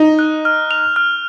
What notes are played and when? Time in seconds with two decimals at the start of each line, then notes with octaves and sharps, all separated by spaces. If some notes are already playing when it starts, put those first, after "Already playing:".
Already playing: D#4
0.19 F#6
0.45 F6
0.71 F7
0.96 F6